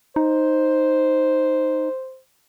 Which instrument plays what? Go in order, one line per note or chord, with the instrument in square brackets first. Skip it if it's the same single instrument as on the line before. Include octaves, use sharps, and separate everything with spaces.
[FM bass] D#4 [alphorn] C5